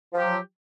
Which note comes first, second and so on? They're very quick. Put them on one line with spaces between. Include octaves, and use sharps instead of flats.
F3 G4 F#3